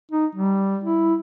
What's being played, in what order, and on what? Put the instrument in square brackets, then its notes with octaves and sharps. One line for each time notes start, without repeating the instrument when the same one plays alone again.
[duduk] D#4
G3
E4